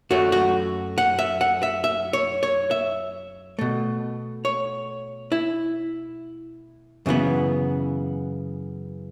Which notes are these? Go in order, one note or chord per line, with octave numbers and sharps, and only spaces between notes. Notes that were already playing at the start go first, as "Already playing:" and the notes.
F#2 F#3 A3 F#4
F#4
F#5
E5
F#5
E5
E5
C#5
C#5
E5
B2 A3
C#5
E4
F#2 C#3 E3 B3